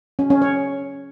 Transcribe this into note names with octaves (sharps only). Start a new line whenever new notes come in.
C#4
C#4
C#5